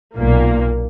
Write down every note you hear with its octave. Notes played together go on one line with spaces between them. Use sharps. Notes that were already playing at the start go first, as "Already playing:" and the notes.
B1 A#2 A#3